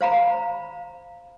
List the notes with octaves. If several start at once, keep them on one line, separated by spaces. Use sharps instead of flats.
C5 F5 A#5 B5